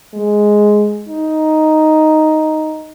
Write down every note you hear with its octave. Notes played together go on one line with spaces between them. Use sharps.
G#3
D#4